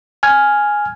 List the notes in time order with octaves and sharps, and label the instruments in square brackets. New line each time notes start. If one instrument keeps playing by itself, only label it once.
[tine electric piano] G#5 F6 G#6